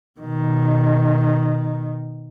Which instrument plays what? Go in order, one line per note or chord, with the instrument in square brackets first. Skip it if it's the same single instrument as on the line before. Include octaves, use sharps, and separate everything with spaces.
[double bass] B2 D#3